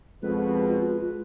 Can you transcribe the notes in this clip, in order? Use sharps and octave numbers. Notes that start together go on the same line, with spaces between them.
F2 B2 G#3 F4 B4